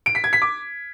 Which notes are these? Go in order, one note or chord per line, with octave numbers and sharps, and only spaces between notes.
D7
B6
G#6
B6
D6